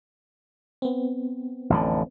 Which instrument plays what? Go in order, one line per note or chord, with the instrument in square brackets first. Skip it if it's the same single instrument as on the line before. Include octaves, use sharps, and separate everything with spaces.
[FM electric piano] B3 C4
[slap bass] A1 F2 D3